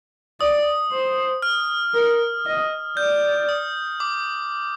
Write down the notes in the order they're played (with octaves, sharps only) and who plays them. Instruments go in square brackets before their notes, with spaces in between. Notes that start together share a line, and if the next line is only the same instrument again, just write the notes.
[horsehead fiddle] D5 [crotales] D#6
[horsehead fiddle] C5
[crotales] F6
[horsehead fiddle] A#4
D#5
[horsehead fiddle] D5 [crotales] G6
[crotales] D#6
D6